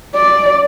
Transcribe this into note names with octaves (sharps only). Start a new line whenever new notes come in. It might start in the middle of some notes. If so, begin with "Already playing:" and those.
D5